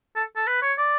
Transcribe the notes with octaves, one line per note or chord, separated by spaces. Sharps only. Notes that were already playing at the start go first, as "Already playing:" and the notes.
A4
A4
B4
C#5
D5